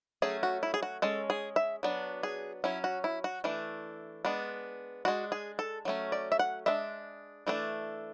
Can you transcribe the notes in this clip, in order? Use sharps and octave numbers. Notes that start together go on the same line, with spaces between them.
F#3 A3 C#4 G#4
F#4
E4
G#4
F#4
G#3 C#4 A4
G#4
E5
F#3 B3 D4
G#4
F#3 C#4 E4
F#4
E4
F#4
E3 A3 D4
G#3 B3 D4
G#3 D4 F#4
G#4
A4
F#3 A3 C#4
D5
E5
F#5
G#3 D4 E5
E3 A3 D4